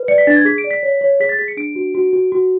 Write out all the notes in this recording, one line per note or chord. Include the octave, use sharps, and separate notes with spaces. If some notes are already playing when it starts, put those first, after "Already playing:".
Already playing: B4
D5 C#7
B6
D4 A6
G#6
G#4 B6
D7
D5
B6
C#5
C#5
G#4 B6
A6
G#4 B6
C#7
D4 D7
F#4
F#4
F#4
F#4